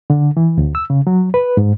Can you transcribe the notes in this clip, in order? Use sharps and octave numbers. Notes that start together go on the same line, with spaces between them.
D3
E3
D2
E6
C#3
F#3
B4
G#2